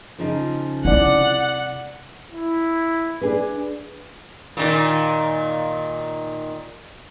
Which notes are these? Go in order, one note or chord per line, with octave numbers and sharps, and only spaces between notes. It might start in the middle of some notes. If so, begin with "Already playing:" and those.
C#3 F3 D#4
C3 E4 D5 F#5
E4
D4 G#4 B4
A#2 D#3